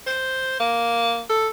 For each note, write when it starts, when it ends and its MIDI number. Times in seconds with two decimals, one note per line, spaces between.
0.07 0.58 72
0.60 1.22 58
1.30 1.48 69